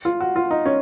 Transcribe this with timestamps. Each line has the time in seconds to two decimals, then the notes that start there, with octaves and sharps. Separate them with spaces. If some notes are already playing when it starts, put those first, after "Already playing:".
0.05 F4
0.20 F#4
0.36 F4
0.51 D#4
0.66 C#4